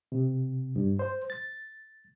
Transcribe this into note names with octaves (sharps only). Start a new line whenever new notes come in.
C3
G2
C5
A6